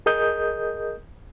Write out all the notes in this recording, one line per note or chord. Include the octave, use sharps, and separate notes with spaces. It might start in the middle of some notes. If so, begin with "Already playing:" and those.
G#4 A#4 D#5 D#6 G6